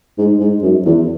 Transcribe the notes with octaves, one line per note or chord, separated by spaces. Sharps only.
G#2
G#2
F#2
E2